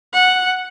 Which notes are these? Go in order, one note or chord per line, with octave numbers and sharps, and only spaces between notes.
F#5